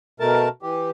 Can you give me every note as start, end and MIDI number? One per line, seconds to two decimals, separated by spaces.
0.20 0.48 47
0.20 0.48 57
0.20 0.48 70
0.20 0.48 81
0.62 0.90 52
0.62 0.90 67